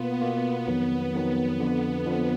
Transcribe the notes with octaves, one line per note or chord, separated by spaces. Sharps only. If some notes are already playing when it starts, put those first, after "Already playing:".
Already playing: B2 A#3 B3 F4
B2 A#3 B3 F4
F2 D#3 F#3
F2 D#3 F#3
F2 D3 F3 B3
F2 D3 F3 B3